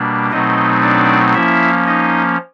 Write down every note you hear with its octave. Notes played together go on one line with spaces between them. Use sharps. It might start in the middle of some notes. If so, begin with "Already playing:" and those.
Already playing: B2 G3 A#3 D4
B2 F#3 A3 C4 D#4 D#5
D4 D5
F3 A#3 C#4 E4 E5
D#4 D#5